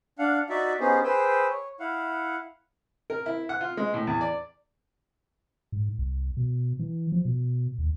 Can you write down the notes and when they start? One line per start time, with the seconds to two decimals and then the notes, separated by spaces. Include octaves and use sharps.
0.19 D4 F5 F#5
0.49 D#4 F#4 D5 E5
0.80 B3 C#4 D#4 G4 G#4 C5
1.04 G#4 B4 C5 G5 E6
1.50 C#5
1.80 E4 F5 F#5
3.10 A#4
3.26 E4
3.49 F#5
3.61 F4
3.77 G#3
3.94 A2
4.07 E2
4.21 D5
5.72 G#2
5.99 C2
6.37 B2
6.79 E3
7.12 F3
7.25 B2
7.78 D#2